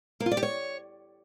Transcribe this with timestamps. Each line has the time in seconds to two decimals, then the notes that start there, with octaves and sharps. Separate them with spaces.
0.20 A#3
0.26 F4
0.32 D5
0.37 G4
0.43 C#5